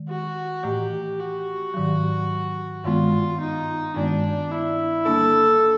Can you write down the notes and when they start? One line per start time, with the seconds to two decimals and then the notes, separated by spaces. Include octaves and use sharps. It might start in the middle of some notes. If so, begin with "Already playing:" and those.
Already playing: D#3 G#3
0.09 F#4
0.63 A2 E3 A3 G4
1.19 F#4
1.74 G#2 D#3 F#3
2.84 G2 D#3 G#3 B3 F4
3.40 D#4
3.96 G2 D#3 G#3 B3 D4
4.51 E4
5.06 D3 G3 A#3 D4 A4